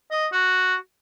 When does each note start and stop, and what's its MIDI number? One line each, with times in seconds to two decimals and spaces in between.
0.11 0.26 75
0.32 0.75 66